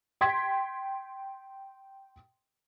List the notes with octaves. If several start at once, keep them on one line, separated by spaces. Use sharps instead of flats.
G5 C6 G#6 B6